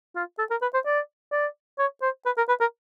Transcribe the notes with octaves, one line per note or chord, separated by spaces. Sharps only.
F4
A4
A#4
B4
C5
D5
D5
C#5
C5
B4
A#4
B4
A#4